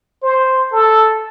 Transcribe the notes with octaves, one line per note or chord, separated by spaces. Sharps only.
C5
A4